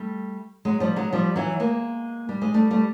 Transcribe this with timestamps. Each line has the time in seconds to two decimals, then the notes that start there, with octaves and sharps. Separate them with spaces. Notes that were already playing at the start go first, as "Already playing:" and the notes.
Already playing: G3 A3
0.65 F#3 G#3
0.80 F3 G3
0.96 F#3 G#3
1.13 F3 G3
1.36 E3 F#3
1.60 G#3 A#3
2.29 G3
2.42 G#3
2.54 G3 A3
2.71 G3 A3